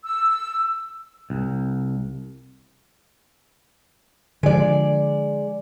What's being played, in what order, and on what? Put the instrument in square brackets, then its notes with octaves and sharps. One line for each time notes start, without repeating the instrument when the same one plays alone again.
[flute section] E6
[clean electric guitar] C2
[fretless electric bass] D3 F3 [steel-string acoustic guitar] G#3 D5